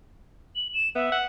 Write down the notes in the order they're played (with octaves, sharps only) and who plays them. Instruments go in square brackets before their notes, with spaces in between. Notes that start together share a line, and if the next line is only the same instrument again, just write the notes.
[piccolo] F#7
E7
[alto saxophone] B3 [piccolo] E5
[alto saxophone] F#5